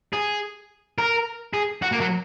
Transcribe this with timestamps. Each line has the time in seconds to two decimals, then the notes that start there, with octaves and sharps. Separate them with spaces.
0.13 G#4
0.98 A#4
1.54 G#4
1.82 F#4
1.92 A#3
2.00 F#3